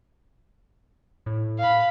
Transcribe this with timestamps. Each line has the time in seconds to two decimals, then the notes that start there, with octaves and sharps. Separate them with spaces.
1.26 A2
1.59 F5 B5